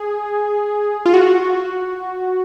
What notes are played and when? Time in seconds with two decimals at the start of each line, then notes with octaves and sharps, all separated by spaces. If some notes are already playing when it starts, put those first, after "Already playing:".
Already playing: G#4
1.06 F4
1.14 F#4